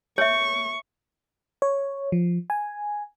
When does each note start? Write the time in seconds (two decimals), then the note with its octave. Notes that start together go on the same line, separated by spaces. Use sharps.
0.18 C#5 E5 C#6
1.62 C#5
2.12 F3
2.50 G#5